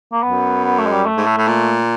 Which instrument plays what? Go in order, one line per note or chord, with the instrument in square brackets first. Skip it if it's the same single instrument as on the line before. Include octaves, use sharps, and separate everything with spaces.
[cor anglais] A#3
[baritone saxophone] F#2 [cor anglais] B3
[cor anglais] B3
A3
G#3
G3
A3
[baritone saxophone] G#2
A2
A2
A#2